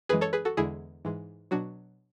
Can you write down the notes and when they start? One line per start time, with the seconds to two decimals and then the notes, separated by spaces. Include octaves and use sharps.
0.09 F#2 E3 G#3 G#4 B4
0.21 A4 C#5
0.33 G#4 B4
0.45 F#4 A4
0.57 E2 D3 G#3 E4 G#4
1.05 G#2 E3 G#3
1.51 B2 F#3 D4 F#4